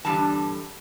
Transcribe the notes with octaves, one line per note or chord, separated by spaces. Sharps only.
E2 G2 D3 G3 A5